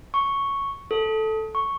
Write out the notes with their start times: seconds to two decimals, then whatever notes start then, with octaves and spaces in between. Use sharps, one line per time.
0.14 C#6
0.91 A4
1.55 C#6